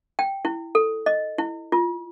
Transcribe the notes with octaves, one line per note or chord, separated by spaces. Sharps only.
G5
E4
A4
D#5
E4
F4